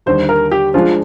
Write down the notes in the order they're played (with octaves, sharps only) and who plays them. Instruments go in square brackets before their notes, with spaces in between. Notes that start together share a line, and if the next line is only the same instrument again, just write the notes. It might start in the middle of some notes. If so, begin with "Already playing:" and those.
[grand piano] D#2 D3 G3 [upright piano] C5
[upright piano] A#4
G4
[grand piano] F3 G#3 D4 G#4 C5 [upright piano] F4